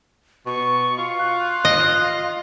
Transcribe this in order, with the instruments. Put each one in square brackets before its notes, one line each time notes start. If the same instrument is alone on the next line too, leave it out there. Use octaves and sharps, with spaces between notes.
[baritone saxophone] B2 [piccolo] C#6
[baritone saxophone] F4
[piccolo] F#6
[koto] D#5